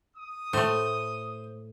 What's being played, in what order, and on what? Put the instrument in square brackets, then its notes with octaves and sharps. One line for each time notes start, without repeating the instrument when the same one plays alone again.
[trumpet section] D#6
[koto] A2 A3 [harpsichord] C5